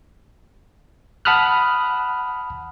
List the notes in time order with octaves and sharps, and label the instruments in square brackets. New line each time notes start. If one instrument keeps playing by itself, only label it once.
[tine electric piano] F#5 A5 B5 D#6 F6 F#6